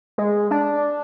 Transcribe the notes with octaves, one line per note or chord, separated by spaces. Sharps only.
G#3
D4